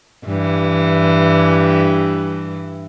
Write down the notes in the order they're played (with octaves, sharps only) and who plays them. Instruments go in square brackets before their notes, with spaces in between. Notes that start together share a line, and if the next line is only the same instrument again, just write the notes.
[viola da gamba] G2 E3